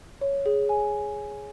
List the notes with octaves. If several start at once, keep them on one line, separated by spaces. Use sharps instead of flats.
C#5
G#4
G#5